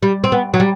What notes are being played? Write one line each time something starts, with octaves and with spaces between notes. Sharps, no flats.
G3
C4
B3
F#3
G3